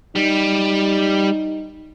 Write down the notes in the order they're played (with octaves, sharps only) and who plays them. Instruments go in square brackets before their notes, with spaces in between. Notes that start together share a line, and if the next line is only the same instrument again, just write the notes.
[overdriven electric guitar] G3 [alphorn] D#4